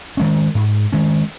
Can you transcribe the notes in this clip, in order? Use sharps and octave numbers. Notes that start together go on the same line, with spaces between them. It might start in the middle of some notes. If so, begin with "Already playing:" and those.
D#3 G#3 C#4
G#2
D#3 G#3 C#4